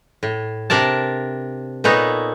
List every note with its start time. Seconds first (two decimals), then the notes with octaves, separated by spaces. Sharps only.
0.23 A2
0.70 C3 D4 A#4 D5 A5
1.84 A#2 B3 D#4 A4 C#5